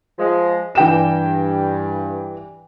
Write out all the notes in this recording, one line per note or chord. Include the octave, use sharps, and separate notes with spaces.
F3 G#3
G2 E3 G5 E7